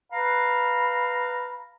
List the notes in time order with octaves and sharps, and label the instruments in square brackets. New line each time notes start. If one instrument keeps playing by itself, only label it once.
[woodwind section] B4 F5 A#5 B5